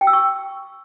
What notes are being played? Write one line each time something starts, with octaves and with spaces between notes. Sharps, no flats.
G5
E6
C#6